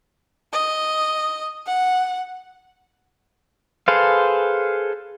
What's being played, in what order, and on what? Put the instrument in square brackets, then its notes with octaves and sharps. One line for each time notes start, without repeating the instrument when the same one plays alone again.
[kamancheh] D#5
F#5
[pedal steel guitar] G#4 A4 B4 C5 F5